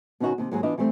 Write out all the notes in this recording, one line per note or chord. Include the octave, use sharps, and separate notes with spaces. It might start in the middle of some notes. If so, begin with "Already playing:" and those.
B2 D#3 C#4 D#4 F#4
D#2 C3
D#2 G#2 F#3 G#4
E3 B3 D4 F4 D#5
E3 G3 A3 C4